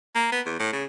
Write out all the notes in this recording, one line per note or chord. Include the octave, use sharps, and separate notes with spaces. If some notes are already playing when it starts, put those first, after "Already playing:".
A#3
B3
E2
A2
C#3